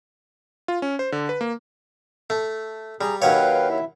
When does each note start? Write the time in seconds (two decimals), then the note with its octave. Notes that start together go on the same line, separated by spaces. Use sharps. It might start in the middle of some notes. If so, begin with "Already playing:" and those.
0.68 F4
0.82 C#4
0.99 C5
1.12 D3
1.29 B4
1.41 A#3
2.30 A3
3.01 G3 G#4 A#5
3.22 D#2 F#3 B4 C#5 F5 G5
3.70 E4 E5